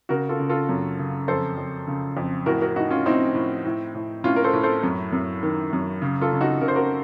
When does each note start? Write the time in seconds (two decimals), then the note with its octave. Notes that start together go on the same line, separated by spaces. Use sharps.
0.09 C#3 F#4 A#4
0.29 F4 A4
0.39 C#3
0.49 F4 A4
0.69 F#2
0.99 C#3
1.28 F2 A4 C5
1.57 F2
1.87 C#3
2.17 F2
2.46 A2 F#4 A#4
2.61 F#4 A#4
2.76 A2 D#4 F#4
2.91 C#4 F4
3.06 A2 C4 D#4
3.35 A2
3.65 A2
3.95 A2
4.24 A2 C#4 F4
4.36 A#4
4.44 A4 C5
4.53 A2
4.63 A4 C5
4.83 F#2
5.13 F#2
5.43 D#3
5.73 F#2
6.02 C#3
6.21 F4 A4
6.32 C#3
6.41 D#4 F#4
6.61 C#3 A#4
6.68 C5
6.75 F#4 A#4